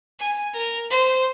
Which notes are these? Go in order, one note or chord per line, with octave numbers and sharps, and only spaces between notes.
G#5
A#4
C5